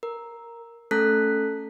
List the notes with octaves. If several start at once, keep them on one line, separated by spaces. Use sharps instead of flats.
A#4
A3 C#4 A4 A5 F#6 B6